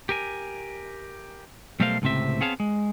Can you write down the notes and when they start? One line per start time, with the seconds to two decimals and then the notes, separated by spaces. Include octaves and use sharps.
0.09 G4 A#4 G#5
1.80 B1 G3 A3 A#4 C5 F5
2.02 C#2 A2 C3 C4 E5
2.41 B3 C4 G#4 C#5 F5 A5
2.60 G#3